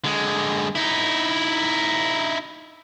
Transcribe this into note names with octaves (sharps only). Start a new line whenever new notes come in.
D3 G#3
D#4 E4